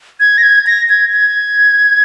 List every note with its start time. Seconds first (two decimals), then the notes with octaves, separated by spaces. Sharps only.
0.20 G#6
0.38 A#6
0.43 G#6
0.67 A#6
0.89 G#6
1.13 G#6